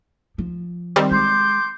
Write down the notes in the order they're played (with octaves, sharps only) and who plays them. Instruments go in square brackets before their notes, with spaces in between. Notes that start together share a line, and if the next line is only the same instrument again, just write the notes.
[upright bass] F3
[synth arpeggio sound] D#3 G3 C4
[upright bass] G#3 [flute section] C6 D6 G6